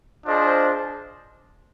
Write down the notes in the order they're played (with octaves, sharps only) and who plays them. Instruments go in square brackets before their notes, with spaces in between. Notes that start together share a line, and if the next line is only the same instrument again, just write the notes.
[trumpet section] D4 F4 G#4 C5 D#5